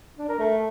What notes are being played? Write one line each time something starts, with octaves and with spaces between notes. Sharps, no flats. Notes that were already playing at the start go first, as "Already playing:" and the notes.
D4
A#4
A3